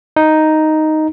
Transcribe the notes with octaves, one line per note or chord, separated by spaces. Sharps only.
D#4